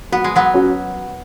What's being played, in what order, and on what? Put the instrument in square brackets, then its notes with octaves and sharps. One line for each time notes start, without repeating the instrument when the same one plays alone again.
[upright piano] F#3 [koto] B3
[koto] G#3
F#3 B3
[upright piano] C#4 F#4